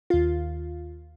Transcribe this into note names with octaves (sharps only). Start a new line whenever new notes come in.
D#2 F4